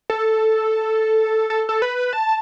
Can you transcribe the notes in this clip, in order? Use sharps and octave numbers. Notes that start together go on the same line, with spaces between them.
A4
A4
A4
B4
A5